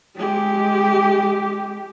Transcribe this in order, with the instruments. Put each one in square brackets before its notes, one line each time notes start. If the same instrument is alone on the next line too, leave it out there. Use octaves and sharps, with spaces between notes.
[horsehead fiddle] G#3 G4